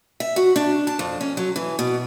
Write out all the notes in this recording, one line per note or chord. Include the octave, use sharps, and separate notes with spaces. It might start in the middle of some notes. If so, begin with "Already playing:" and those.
E5
F#4
D4
A5
F2
C#4
F#3
E3
B2